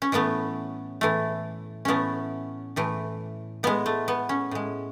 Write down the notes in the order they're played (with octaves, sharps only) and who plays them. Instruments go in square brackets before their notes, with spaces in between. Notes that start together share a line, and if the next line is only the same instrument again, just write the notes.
[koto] C#4
A2 E3 A3 B3
A2 E3 A3
A2 E3 A3 B3 C#4
A2 E3 A3
A2 G#3 B3
A3
B3
C#4
A2 G#3